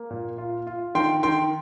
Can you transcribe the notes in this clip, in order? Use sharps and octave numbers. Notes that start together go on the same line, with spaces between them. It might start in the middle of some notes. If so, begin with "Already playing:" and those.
Already playing: A#3
A#2
F4
F4
D#3 G5 C6
D#3 G5 C6